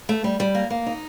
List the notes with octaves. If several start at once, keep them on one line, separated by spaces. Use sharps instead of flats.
A3
G3
G3
A#3
A#3
D#4